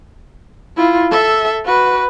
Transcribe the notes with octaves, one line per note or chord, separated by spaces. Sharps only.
E4 F4
A4 E5
F#4 B4